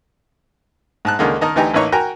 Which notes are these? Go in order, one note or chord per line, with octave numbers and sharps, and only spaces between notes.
G#2 A5 F#6
C#2 D3 D#3 G#3 A#3
D#3 A#4 D#5 A5
D2 E3 D#4 G4 G#5 A#5
A1 E3 A#3 D#4 C#5 C#6
F#4 A#4 G5 G#5 A#5